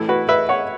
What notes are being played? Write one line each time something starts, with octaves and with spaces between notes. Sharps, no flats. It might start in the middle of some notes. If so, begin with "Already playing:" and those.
Already playing: A2 E3 E4 A4
F#4 B4
B4 E5
C#5 F#5